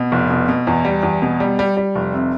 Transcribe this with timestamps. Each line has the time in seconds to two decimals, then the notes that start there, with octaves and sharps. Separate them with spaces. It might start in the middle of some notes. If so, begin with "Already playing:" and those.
Already playing: B2
0.12 F1
0.30 B2
0.48 B2
0.67 E2
0.85 G3
1.03 E2
1.22 B2
1.40 G3
1.59 G3
1.77 G3
1.95 F1
2.14 C3